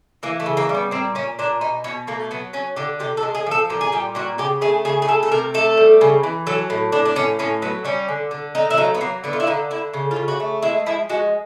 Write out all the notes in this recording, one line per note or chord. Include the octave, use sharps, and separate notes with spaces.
E3 A#3
A3
C#3
A#3
G3
B3
A#2 C4
A#2 C#4
A#2 D4
B2 D#4
B2 C#4
A3 A#3
F#3 B3
F#3 C#4
D3 G4
C3 G4
A4
G#3
G#4
F3 A4
A#2 G4
G#4
G3 G4
A#2 F#4
C#3 G4
A3 G#4
C#3 G#4
G#4
A3 A4
A4
C3 A#4
A3 A4
G3
C#3
E3
F#3 A4
A2
A2 D4
D4
A2 C#4
A2 C#4
F#3 B3
G3 C#4
D3
D3
A3 D#4
E4
F#3 D#4
B3
F#3 A#3
D3 B3
F4
E4
D3 D#4
D3 E4
C#3
F4
C#3
F#4
A3
G#3 E4
F3 E4
G#3 F#4